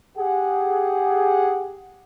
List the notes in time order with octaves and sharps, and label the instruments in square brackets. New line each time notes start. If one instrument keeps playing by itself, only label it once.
[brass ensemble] G4 G#4 F#5